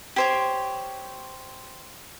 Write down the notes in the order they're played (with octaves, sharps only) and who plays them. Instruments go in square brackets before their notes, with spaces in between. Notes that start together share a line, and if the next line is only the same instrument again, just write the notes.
[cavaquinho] G4 C5 C#5